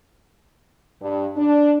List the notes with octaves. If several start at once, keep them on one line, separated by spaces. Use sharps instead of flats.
G2
D4